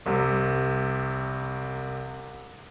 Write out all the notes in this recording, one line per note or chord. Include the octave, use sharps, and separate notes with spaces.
C2 C3